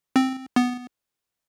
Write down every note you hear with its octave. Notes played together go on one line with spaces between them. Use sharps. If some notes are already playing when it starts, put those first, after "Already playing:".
C4
B3